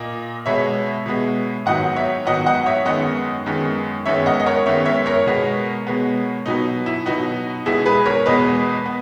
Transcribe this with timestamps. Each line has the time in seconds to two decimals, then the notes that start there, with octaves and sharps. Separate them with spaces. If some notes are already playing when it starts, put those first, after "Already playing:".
Already playing: A#2 A#3 D#5
0.46 B2 G#3 B3 C#5 E5
1.06 B2 G#3 B3
1.66 G#2 D#3 F#3 B3 D#5 F#5
1.96 C#5 E5
2.26 G#2 D#3 F#3 B3 D#5 F#5
2.46 D#5 F#5
2.66 C#5 E5
2.86 F#2 D#3 G#3 B3 D#5 F#5
3.46 F#2 D#3 G#3 B3
4.06 F#2 D#3 G#3 B3 C#5 E5
4.26 D#5 F#5
4.40 D#5
4.46 A#4 C#5
4.66 F#2 D#3 G#3 B3 C#5 E5
4.86 C#5 E5
5.06 A#4 C#5
5.26 B2 G#3 B3
5.87 B2 G#3 B3
6.46 B2 F#3 B3 D#4
6.86 E4
7.06 B2 F#3 B3 D#4 F#4
7.66 E2 B2 G#3 B3 E4 G#4
7.86 G#4 B4
8.06 A#4 C#5
8.26 E2 B2 G#3 B3 B4 D#5
8.86 B3